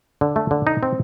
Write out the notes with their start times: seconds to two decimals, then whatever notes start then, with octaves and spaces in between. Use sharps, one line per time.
0.21 D3
0.36 A3
0.51 D3
0.67 D#4
0.83 C4